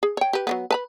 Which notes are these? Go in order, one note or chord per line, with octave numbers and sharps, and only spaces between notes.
G#4
C#5 G5
G4 B4
F#3 A3 B3
B4 A5 B5